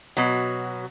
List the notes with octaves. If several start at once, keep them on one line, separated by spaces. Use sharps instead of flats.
B2 F#3